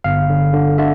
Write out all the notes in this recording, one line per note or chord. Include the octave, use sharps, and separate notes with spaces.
G1 F5
D3
D3
D3 E5